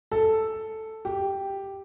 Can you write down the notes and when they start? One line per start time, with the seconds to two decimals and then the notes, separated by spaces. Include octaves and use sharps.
0.12 A4
1.05 G4